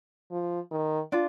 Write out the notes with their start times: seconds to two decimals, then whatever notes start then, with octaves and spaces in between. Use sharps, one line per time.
0.31 F3
0.71 D#3
1.12 D4 F4